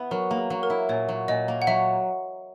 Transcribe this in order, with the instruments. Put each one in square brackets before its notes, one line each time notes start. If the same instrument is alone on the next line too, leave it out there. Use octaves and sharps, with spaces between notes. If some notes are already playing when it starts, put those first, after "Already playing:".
Already playing: [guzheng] B3 E4
[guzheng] F#3 [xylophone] A#4
[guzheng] A#3
[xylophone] G#4
[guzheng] F#3
[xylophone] A#4
[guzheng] E4
[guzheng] A#2 [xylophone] C#5
[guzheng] F#3
[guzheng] A#2 [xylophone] D#5
[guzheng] A#3
[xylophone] F#5
[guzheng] F#3 [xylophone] E5